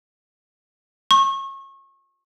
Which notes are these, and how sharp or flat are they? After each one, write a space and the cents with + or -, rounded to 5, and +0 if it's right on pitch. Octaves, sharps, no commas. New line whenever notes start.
C#6 -30